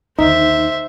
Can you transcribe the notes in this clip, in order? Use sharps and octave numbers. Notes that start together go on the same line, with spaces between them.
D#2 D3 D#4 C5 E5